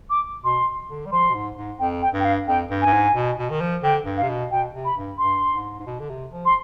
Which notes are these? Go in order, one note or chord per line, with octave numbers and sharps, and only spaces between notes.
D6
B2 C6
D3
G3
F3 C6
B2
G#2
G#2
F2 G5
G5
G2
G5
F5
F2 G5
G2
G2 G#5
G#2
B2
B2
D#3
F3
D3 G5
G2
F5
C3
B2
B2 G5
C3
B5
G2
G2 C6
G#2
G#2
B2
D3
C3
F3
C6